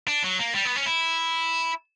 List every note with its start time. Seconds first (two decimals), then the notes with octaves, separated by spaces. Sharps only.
0.08 D4
0.23 F#3
0.39 A#3
0.55 G3
0.65 B3
0.76 C#4
0.86 E4